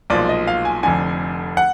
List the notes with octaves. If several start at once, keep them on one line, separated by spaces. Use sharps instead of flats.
B1 A#2 F3 G#3 D5
D#5
F5
G#5
F1 F2 D3 G#5
F#5